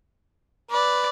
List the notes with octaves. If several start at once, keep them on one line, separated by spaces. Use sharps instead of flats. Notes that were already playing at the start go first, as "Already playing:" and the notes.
B4 D5